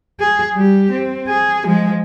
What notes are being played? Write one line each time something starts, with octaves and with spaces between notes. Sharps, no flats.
G#4
G3 G4
C4
G#4
F3 G#3